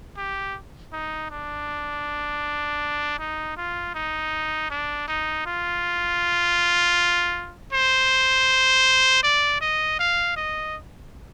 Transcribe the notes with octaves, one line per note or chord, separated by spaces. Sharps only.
G4
D#4
D4
D#4
F4
D#4
D4
D#4
F4
C5
D5
D#5
F5
D#5